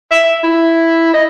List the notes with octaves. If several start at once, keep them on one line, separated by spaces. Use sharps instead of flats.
E5
E4
D#5